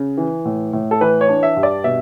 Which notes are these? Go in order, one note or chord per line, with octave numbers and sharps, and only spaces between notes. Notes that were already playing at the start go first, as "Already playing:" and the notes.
Already playing: C#3
E3
A2
A2
A4
E3 B4
C#5
D4
E5
G2
D5
B2 E5